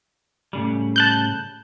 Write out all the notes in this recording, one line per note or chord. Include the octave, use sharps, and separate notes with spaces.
A2 C#3 G3
A5 F#6 G6